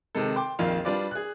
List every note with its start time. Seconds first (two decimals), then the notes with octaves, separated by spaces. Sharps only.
0.15 C3 D#3 G#3 A4
0.36 G5 C6 D6
0.59 A#1 F2 D#3 A#3 F4 F5
0.85 G3 D4 F4 B4 D5
1.11 G#4 F#6